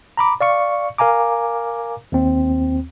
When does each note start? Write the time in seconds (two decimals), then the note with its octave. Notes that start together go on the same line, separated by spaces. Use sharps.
0.17 A#5 B5 D6
0.41 D5 F5 C#6 C#7
0.98 A#4 F5 G#5 A#5 D6
2.12 D#2 C4